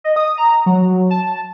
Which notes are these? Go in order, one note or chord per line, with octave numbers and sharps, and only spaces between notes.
D#5
D#6
A#5
F#3
A5